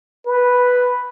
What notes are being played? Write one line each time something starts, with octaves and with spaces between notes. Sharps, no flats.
B4